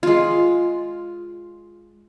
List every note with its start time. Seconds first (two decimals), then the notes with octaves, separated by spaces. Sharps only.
0.03 G#3 F4